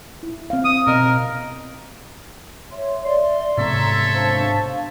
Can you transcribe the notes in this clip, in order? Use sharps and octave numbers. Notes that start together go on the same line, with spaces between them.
E4
C4 F5
D#6
B2 C4 A#4 D#5
C#5 E5 C6
D5 E5 C6
G#2 C3 B3 A4 C#5 E5 A#5
D4 C5 F5 A5